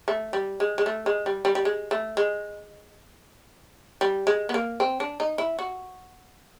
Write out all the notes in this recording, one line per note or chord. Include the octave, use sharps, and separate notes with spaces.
A3
G3
G#3
G#3
A3
G#3
G3
G3
G3
G#3
A3
G#3
G3
G#3
B3
A#3
C4
D4
D#4
E4
F#4